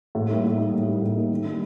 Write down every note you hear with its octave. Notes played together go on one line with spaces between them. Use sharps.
A2
G3 A#3 D#4
A2
G3 A#3 D#4
A2
G3 A#3 D#4
A2
G3 A#3 D#4
D#3
G3 A#3 D4